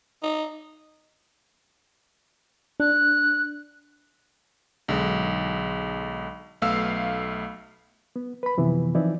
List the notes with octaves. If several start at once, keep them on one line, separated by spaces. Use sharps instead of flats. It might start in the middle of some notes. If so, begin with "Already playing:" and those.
D#4
D4 F#6
B1 D3 G#3
B1 A3 B3 F5 E6 C7
B3
B4 B5
F#2 C3 E3 F3 B3
E3 F3 C4 D#4 E4 D5